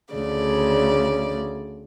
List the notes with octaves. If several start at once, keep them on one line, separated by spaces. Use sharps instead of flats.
D2 C#3 D5